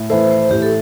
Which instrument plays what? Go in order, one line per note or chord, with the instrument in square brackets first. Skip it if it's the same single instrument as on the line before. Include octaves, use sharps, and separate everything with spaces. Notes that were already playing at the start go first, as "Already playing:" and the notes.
Already playing: [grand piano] A2
[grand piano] E3 A3 E4 A4 [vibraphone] C5
[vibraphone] C5
[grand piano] A2 [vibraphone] G4
[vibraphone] A4